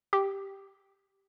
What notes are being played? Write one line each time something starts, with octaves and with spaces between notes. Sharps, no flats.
G4